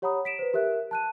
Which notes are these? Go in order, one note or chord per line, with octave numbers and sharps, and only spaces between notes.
G4 C#5 F#5 A#5 B5 D#6
B6 D7 E7
B4 C5
G4 A#4 E5 F#6
A5 F#6 D#7